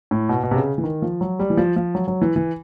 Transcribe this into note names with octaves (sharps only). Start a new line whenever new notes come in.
A2
B2
B2
C3
C#3
E3
D#3
F3
F#3
G3
E3
F3
F3
F#3
F#3
E3
E3